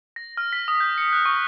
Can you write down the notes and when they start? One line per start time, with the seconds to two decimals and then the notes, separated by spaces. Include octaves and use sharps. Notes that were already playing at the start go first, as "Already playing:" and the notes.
0.16 A#6
0.37 F6
0.53 B6
0.68 D#6
0.80 G6
0.98 C#7
1.13 F#6
1.25 C#6